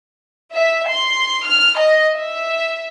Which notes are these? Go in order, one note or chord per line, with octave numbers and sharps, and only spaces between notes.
E5
C6
F6
D#5
E5